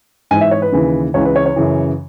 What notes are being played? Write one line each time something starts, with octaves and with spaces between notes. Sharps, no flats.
G#2 E3 G#5
E5
C#5
B4
D#2 C#3 E3
C#2 C#3 E3 C#5
B4
C#5
C#5
F#2 C#3 E3